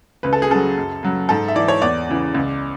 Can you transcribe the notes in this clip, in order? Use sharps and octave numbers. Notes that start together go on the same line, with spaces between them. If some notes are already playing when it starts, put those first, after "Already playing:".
C#2 B4
A4
G#4
C#3 F#3 A4
F#2
C#3 F#3
G#2 A4
E5
E3 D5
C#5
E2 D5
C#3 E3
C#2